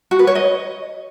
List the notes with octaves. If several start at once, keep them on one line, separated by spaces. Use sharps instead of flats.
F#4
B4
C#5
D#5